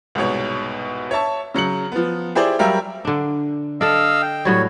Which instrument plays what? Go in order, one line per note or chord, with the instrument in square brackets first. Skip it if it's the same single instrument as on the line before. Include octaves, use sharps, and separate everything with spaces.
[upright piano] C2 G#2 B2 C#5
C#5 E5 A5 C#6
C#3 F#3 C#7 F#7
F3 B3
E4 G4 G#4 C5 D5
F#3 G3 G4 A#4 E5 F5
[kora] D3 D4
[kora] D4 A4 [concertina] D#5 F5 E6
[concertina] G5
[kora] A2 F#3 G3 [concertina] C#5